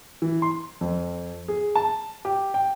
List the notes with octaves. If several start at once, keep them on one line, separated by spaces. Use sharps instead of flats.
E3
C6
F2
G#4
A5
G4
G5